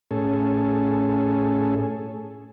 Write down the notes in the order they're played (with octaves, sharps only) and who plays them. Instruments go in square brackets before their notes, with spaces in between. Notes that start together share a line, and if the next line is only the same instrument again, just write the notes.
[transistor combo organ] A2 C#4 G#4 A4